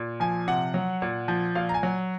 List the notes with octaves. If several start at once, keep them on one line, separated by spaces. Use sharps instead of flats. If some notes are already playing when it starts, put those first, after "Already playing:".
Already playing: A#2
F3 G#5
C3 F#5
F#3
A#2
F3
A#2 F5
A#5
G#5
F#3